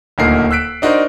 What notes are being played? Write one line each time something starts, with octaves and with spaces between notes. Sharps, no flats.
D#1 D2 A#2 D#4 A#4 C7
E6 F#6 B6 D7
D4 D#4 F#4 A#4 C5